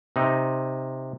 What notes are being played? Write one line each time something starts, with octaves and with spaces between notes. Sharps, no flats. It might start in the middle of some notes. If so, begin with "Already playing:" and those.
C3 D#4